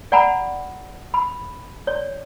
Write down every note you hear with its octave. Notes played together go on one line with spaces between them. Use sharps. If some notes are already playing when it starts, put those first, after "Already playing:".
D5 F#5 G#5 A#5 B5
B5
C#5 D5